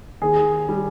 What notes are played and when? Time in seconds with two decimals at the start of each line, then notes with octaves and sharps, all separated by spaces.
0.22 D#2 G#4
0.69 G3